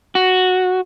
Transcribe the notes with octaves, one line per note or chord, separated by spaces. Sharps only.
F#4